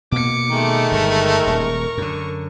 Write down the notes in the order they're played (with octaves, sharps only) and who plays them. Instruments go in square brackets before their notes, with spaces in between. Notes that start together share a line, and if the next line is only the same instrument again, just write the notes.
[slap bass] B2 A#3 [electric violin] D6 C#7
[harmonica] D#3 G#3 A3
[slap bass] G1 [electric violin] A#4 C#6
[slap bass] D#1
F#2 D3